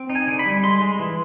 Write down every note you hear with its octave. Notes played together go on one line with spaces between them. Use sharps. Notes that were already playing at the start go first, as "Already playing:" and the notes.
Already playing: C4
D#4
G#5
D3
B5
G3
G#3 C6
G#3
E3